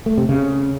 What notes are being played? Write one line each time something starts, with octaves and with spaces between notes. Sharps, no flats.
A3
C3
C#3